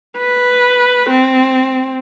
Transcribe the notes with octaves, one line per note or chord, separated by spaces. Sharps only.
B4
C4